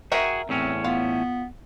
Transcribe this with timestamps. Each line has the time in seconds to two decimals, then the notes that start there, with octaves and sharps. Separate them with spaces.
0.12 F#4 G#4 A#4 E5 G5
0.49 E2 A2 C4 C#4
0.84 B3 F4